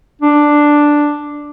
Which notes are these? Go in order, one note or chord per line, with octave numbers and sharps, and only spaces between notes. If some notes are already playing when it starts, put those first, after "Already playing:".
D4